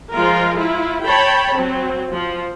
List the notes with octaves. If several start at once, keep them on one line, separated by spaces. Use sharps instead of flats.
F3 G#3 F4 A#4
E4 F4
C#5 G5 A5 B5
F#3 C4
F3